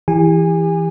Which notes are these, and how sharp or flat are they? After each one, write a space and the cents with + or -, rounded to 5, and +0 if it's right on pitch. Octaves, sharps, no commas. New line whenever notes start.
E3 +0 G4 +35 G#5 -20